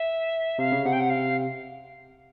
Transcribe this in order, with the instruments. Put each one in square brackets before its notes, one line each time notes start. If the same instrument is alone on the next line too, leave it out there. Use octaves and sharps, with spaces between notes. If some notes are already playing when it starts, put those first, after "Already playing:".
Already playing: [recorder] E5
[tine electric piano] C3 [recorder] F5
[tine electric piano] C#3
[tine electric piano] C3 [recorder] F#5
[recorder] G5
F#5
F5